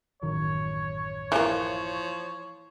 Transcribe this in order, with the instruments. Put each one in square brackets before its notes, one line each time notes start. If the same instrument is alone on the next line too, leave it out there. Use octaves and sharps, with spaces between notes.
[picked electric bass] A1 F#2 D#3 [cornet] C#5
[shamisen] E3 A#3 [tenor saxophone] F3